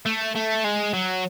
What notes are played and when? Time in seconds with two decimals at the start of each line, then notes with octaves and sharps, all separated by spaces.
0.06 A3
0.35 A3
0.64 G#3
0.94 F#3